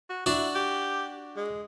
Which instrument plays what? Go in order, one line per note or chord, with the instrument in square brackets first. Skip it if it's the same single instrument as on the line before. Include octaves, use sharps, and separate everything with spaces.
[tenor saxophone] F#4
[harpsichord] D4 F#4 [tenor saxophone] E4
[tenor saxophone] G4
G#3